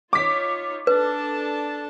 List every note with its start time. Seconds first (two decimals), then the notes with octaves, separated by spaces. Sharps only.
0.13 D#4 F4 C#5 D6 B6
0.87 D4 A4 B4 A5